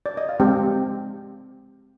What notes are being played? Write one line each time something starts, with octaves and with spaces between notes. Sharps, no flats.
D5
D#5
F5
G#3 C4 G4 G5